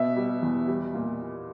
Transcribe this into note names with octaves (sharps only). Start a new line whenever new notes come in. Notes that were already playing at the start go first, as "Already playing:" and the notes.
Already playing: B2 E5
G3
E2
G3
A#2